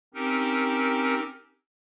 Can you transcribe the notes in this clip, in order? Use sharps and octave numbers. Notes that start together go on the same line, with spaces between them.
C4 C#4 D#4 G4 A#4